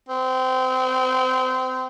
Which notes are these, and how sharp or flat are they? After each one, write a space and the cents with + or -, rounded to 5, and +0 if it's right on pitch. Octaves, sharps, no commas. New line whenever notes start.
C4 -25